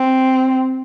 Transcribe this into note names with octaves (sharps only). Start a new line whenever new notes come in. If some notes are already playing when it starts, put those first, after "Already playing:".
Already playing: C4